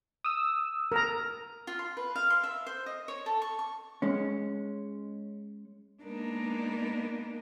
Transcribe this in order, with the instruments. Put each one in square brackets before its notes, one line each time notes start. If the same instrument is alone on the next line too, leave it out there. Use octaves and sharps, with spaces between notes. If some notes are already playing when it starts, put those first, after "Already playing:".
[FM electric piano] D#6 E6
[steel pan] A#4 A#5
[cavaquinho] F4
C6
B4
F5
C6
E5
C5
D#5
C#5
A4
C#6
C#6
[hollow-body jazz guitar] G#3 C#4
[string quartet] G#3 A#3 B3 D4 D#4 A#4